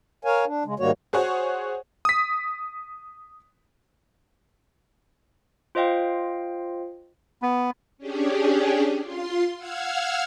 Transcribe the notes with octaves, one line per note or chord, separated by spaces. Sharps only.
A#4 C#5 F5 G#5
D4
C#3 G#3
G#2 D#3 G3 A#3 F#4 C#5
F#4 G#4 C5 C#5 F#5
D#6 B6
F4 C5 D#5 F5 G5
B3
C#4 D4 G4 G#4
F4 C6
F5 F#5 E6 F6 G#6